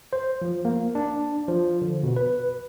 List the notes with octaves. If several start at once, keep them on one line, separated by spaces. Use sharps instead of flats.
C5
F3
A#3
D4
F3
D3
B2
B4